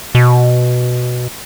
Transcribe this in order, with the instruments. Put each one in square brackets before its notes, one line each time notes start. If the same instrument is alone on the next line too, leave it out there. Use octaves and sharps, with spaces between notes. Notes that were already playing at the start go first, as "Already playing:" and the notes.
[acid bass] B2